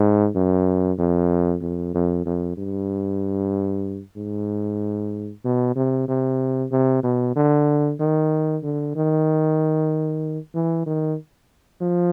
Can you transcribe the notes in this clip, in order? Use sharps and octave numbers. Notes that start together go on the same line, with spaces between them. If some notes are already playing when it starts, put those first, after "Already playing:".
Already playing: G#2
F#2
F2
F2
F2
F2
G2
G#2
B2
C3
C3
C3
B2
D3
D#3
D3
D#3
E3
D#3
F3